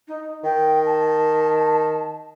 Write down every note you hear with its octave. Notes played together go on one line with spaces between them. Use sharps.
D#4
D#3 G5
A5